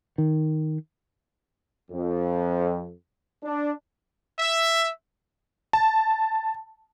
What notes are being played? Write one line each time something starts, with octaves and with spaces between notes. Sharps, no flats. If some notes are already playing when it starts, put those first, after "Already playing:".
D#3
F2
D4
E5
A5